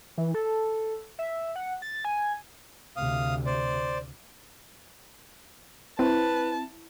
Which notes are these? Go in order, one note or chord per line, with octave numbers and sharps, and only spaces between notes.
E3
A4
E5
F#5
A6
G#5
D2 C3 F5 D#6
C5 D5
C4 E4 B4 A5